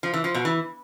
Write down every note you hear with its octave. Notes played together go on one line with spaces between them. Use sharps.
F3
E3
F3
B2
E3